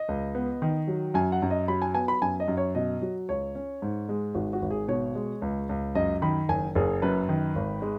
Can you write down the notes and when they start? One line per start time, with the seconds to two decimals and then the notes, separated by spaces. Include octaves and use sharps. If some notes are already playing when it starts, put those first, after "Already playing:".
Already playing: D#5
0.08 C#2
0.35 B3
0.62 D#3
0.88 F#3
1.14 F#2 G#5
1.32 F#5
1.42 F#2
1.50 D#5
1.68 F#3 B5
1.82 G#5
1.95 B3 G#5
2.08 B5
2.22 F#2 G#5
2.40 D#5
2.48 F#2
2.57 C#5
2.75 B2 D#5
3.02 F#3
3.29 C#2 C#5
3.55 C#4
3.82 G#2
4.09 G#3
4.35 G#1 F#4
4.53 F#4
4.62 G#1
4.71 G#4
4.88 B2 C#5
5.15 G#3
5.42 C#2
5.69 C#2
5.95 F#2 D#5
6.22 D#3 B5
6.49 F#1 G#5
6.75 F#1 G#4
7.02 F#2 B4
7.29 D#3
7.55 G#1
7.82 G#3